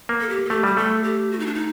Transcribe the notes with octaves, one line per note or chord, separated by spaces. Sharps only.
A#3
A4
G4
A4
A3 G4
G3 G4
A3 A4
G4
F#4
D#4
D4
D#4